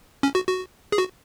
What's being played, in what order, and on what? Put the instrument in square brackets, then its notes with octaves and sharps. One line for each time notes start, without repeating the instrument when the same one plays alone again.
[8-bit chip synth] C#4
F#4
F#4
G#4
F#4